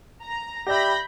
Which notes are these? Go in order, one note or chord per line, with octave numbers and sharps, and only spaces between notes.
A#5
G4 D5 E5 B5 G6 A#6